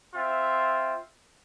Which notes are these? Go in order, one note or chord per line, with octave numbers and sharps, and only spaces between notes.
C4 F4 E5